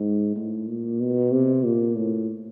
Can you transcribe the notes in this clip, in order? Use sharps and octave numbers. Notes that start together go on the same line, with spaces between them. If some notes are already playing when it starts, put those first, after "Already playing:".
Already playing: G#2
A2
A#2
B2
C3
A#2
A2